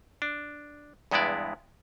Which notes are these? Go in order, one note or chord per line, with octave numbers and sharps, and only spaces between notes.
D4
E2 G2 G#3 B3 E4 D5